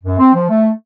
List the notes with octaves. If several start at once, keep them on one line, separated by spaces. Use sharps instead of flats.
F#2
C4
F3
A3